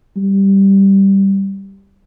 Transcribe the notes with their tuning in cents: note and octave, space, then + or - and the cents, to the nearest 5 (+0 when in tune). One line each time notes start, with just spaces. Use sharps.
G3 -5